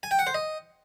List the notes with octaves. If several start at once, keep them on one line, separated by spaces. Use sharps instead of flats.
G#5
G5
F#5
C5
D#5